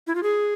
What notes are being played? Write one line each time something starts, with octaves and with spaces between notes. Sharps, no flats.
E4
F4
G#4